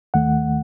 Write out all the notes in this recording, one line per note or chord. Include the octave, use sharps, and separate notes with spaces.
D#2 D#3 A3 F#5